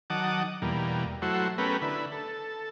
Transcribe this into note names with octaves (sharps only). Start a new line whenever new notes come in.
D#3 F#3 F#5 A5 D6 D#6
E2 B2 G3 A#3
F#3 A3 E4 F#4 C5
A3 B3 C#4 G4 A#4 B4
D3 E4 B4
A4